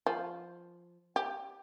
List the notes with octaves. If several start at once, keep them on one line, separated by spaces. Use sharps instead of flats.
F3
G4